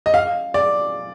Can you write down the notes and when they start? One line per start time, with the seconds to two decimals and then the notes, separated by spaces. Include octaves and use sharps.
0.06 D#5
0.14 F5
0.54 D5